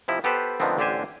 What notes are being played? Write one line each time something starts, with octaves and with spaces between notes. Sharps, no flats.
C3 F3 E4 D#5
B3 G4 A4 B4 C5
D3 D#3 F3 A3 B3 C4
A1 D3 D4 G4 C5 G#5